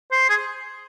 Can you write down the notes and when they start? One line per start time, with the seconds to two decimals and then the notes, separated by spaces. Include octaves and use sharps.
0.12 C5
0.30 G#4